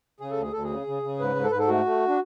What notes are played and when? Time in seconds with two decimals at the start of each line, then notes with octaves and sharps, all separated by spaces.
0.20 C#3 G#4
0.31 A4
0.37 D2 G#4
0.53 D2 A4
0.63 G#4
0.70 C#3
0.87 C#3
1.03 C#3
1.19 G#2 B4
1.35 G#2
1.44 A4
1.51 G#2 B4
1.59 A4
1.68 A3 F#4
1.86 A3
2.08 D4